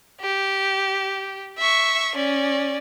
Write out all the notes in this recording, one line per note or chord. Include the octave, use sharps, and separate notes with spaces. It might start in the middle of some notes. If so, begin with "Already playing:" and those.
G4
E5 C#6
C#4 D5